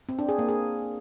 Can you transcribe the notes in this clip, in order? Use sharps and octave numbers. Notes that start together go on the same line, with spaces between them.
C4
D4
G#4
A#3
G#4